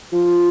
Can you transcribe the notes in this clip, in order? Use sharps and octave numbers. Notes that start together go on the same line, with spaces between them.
F3